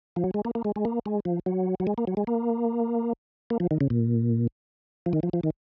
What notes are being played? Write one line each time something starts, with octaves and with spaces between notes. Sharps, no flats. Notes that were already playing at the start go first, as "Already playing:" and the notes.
F3
F#3
G#3
A#3
A#3
G#3
G#3
A#3
G#3
F3
F#3
F#3
G#3
A#3
F#3
G#3
A#3
A#3
F3
D#3
C#3
A#2
F3
D#3
F3
F3
D#3